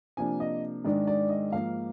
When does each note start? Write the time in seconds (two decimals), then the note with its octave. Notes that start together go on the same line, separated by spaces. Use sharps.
0.17 C3 F3 A#3 D4 G#5
0.40 D#5
0.85 G#2 D#3 G#3 D4 D5
1.07 D5
1.30 D#5
1.52 G#2 F3 A#3 F5